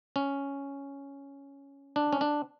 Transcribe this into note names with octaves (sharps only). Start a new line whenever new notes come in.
C#4
D4
C#4
D4